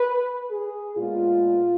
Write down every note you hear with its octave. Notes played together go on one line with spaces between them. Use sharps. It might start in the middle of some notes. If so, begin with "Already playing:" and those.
Already playing: B4
G#4
A#2 G#3 B3 F4